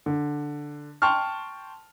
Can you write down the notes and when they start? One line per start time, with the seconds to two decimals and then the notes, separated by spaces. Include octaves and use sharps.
0.06 D3
1.02 G5 A5 C6 C#6 F6